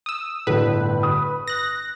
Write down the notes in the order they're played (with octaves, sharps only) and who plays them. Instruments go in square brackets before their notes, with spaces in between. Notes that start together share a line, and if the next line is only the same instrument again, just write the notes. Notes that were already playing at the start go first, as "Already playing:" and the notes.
[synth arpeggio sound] D#6 E6
[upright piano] G1 A2 [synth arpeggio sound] B4
[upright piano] D#6
[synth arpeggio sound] F#6 A#6